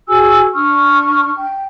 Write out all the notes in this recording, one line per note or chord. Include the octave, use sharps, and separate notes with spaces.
F#4 G#4 G#5 E6
D4 C#6 F6
G5